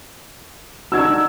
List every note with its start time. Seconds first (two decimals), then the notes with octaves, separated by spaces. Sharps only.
0.92 D4 D#4 F#4 E6 G#6